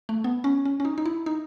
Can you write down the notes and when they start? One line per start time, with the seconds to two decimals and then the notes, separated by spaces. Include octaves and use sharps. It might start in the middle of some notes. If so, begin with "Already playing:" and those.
0.09 A3
0.24 B3
0.44 C#4
0.65 C#4
0.80 C#4
0.85 D#4
0.98 D#4
1.06 E4
1.26 D#4